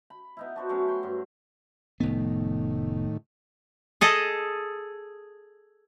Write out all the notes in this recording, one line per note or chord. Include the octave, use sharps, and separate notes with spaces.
B5
B3 D#4 E4
D4 F#4 C5
F#3 A3 B3 C#4
G5 C6
G2 F#3
F1 A2 D#3 B3
G#4 A4 D#5